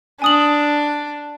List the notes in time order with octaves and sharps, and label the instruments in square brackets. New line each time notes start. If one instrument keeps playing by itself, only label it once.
[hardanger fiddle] D4 [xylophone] G#5 D#6 F#7